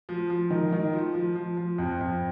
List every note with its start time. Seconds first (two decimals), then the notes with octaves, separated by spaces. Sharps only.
0.09 F3
0.30 F3
0.50 D#3
0.72 D#3
0.93 F3
1.14 F3
1.36 F3
1.57 F3
1.78 F2
2.01 F2